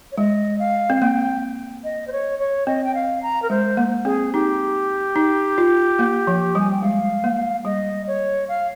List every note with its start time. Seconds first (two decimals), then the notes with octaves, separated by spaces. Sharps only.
0.12 C#5
0.17 G#3 D#5
0.60 F5
0.90 C4
0.96 F5
1.01 A#3 G5
1.84 D#5
2.07 C5
2.12 C#5
2.39 C#5
2.67 C4 D#5
2.84 G5
2.95 F5
3.23 A#5
3.42 A#4
3.50 G#3 C5
3.77 A#3
4.05 C4 G#4
4.33 D#4 G4
5.16 D#4
5.58 F4
5.99 A#3
6.27 F3
6.55 G3 G#5
6.71 G5
6.82 G#3 F5
7.24 A#3
7.65 G3 D#5
8.07 C#5
8.49 F5